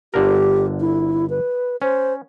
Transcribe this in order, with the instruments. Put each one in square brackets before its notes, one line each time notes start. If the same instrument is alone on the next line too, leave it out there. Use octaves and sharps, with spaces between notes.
[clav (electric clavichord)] G1 D3 A#4 [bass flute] G4
[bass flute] E4
B4
[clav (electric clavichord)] C#4 [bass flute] C5